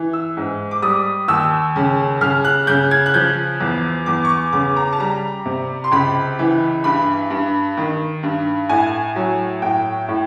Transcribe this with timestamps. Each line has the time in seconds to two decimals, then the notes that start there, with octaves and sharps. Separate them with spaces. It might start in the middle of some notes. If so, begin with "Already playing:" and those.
Already playing: E3
0.13 E6
0.37 G#2
0.71 D6
0.82 G3 D#6
1.28 D#2 E6
1.76 C#3
2.21 C#3 F6
2.45 F#6
2.67 C#3 G6
2.91 G#6
3.06 F#6
3.14 F3 G6
3.60 E2
4.06 E2 D6
4.25 C#6
4.30 D6
4.53 C#3 D6
4.76 A#5
4.93 A5
5.00 G3 A#5
5.45 C3
5.84 C6
5.92 C#2 B5
6.39 E3
6.84 G2 B5
7.30 G2
7.77 D#3
8.23 G2
8.69 A2 G#5
9.16 F#3
9.62 A2 G5
10.08 A2